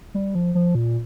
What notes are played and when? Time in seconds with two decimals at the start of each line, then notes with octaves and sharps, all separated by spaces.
0.14 G3
0.35 F3
0.55 F3
0.75 A#2